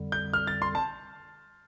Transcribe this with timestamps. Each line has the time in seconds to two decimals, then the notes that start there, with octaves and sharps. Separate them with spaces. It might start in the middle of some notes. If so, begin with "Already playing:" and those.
Already playing: F2 D3 G3
0.12 G6
0.33 F6
0.47 A6
0.62 C6
0.75 A5